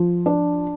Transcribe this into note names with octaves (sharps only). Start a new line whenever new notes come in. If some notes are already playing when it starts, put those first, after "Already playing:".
Already playing: F3
D4